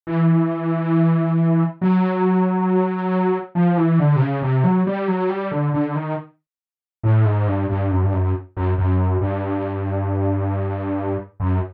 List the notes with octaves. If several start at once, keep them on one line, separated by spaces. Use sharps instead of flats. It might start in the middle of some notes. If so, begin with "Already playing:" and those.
E3
F#3
F3
E3
D3
C3
C#3
C3
F#3
G3
F#3
G3
D3
D3
D#3
A2
G#2
G2
G2
F#2
G2
F#2
F#2
F#2
G2
F#2